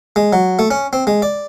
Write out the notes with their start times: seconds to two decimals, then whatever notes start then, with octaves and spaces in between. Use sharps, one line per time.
0.16 G#3
0.33 F#3
0.59 A3
0.71 C#4
0.93 C4
1.07 G#3
1.22 D5